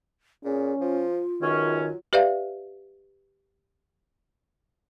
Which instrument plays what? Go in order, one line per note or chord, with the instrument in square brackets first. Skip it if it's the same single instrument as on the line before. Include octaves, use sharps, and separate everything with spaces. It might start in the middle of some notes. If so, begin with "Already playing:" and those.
[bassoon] A#2 [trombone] C#4 [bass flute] G#4
[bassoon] F3 [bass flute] F4
[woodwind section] C#2 F#2 C#4 [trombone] D#3 [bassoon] F#3
[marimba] G4 B4 D5 E5 F5